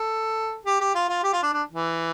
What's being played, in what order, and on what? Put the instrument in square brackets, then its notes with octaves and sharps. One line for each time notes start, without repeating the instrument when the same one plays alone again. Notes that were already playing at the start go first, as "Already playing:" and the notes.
Already playing: [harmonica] A4
G4
G4
F4
F4
G4
F4
D4
D4
E3